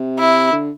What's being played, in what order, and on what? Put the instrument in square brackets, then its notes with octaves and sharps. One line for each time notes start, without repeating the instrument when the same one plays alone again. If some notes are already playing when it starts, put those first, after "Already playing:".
Already playing: [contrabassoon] C3
[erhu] E4
[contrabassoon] D3